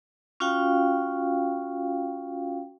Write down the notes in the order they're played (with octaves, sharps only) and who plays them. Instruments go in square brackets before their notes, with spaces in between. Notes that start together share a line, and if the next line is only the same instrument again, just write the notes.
[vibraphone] C#4 F4 F#4 F5 G5